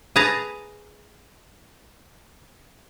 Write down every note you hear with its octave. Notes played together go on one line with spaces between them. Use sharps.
G#4 B4 A5 A#5